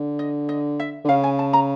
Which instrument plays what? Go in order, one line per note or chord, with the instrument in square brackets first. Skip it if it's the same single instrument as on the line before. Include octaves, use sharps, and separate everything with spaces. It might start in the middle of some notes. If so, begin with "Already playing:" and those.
Already playing: [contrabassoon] D3
[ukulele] D#5
D#5
E5
[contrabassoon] D3
[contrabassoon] C#3 [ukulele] F5
[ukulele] G#5
A5
A#5